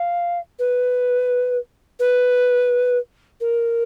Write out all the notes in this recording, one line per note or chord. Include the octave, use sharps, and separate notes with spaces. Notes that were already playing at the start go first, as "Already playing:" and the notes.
Already playing: F5
B4
B4
A#4